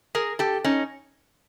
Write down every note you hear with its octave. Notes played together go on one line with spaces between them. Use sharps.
G#4 A#4
G4 A4
C#4 D#4